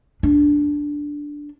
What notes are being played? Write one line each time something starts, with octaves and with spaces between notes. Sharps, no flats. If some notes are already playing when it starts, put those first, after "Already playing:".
D4